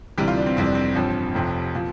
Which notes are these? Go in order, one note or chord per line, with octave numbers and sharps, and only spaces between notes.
D2 C3 E3 G3 G4
F4
D4
C4
F1 F2 E3 G3 C4
D4
C4
A1 G2 F3
F1 F2 C3 F3
A#2 F3